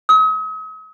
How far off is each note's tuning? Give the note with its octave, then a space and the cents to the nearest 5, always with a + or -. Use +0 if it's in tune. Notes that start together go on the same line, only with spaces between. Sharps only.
D#6 +45